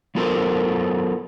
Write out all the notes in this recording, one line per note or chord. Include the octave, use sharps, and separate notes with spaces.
F#3 B3 F4 A4 A#4 C5